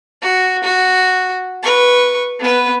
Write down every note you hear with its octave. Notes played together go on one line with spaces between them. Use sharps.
F#4
F#4
B4 C#6
B3 B4